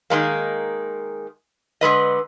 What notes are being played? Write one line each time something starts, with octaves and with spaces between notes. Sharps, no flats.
D#3 G#3 A#3
D3 G#3 B4 D#5